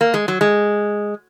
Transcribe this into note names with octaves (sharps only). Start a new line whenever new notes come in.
A#3
G#3
F#3
G#3